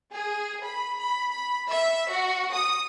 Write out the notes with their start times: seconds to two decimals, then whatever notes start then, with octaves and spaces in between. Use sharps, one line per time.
0.12 G#4
0.64 B5
1.01 B5
1.33 B5
1.72 E5
2.10 F#4
2.53 D#6